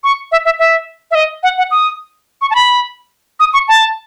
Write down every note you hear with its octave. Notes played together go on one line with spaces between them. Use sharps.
C#6
E5
E5
E5
E5
D#5
F#5
F#5
D#6
C#6
A5
B5
D#6
C#6
A5